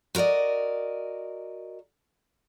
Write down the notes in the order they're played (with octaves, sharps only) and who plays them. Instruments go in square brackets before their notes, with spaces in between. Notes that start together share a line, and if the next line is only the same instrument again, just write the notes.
[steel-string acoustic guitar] F#4 A#4 C5 D5 D#5